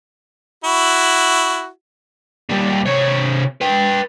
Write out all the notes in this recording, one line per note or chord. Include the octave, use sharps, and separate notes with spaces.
E4 F#4
D#2 G3
C3 C#5
B4 G5